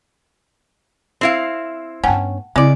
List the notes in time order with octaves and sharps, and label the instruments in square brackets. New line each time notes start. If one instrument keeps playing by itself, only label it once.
[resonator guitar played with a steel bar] C4 E4 F5
[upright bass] G2 B3 [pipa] C#4 [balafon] F#5 G5 A5
[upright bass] C#3 [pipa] G#3 D5 [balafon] C4 E4